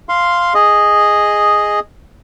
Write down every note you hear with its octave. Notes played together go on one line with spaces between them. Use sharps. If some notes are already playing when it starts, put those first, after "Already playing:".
F5 C6
G#4 D#5